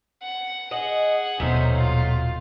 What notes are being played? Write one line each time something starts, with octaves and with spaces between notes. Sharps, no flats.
F#5
G#4 D#5 F#5
D#1 B2 F#3 A3 C#4 D#4 C5
F4